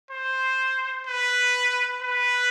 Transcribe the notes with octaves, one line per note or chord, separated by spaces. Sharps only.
C5
B4
B4